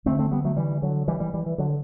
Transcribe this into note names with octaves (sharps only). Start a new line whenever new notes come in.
D2 D3 A3 C4
A3 C4
G3 B3
F#3 A3
E3 G3
D3 F#3
E3 G3
E3 G3
E3 G3
E3
D3 F#3